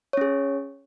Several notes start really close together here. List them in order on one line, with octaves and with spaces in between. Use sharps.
C#5 C#4 G#4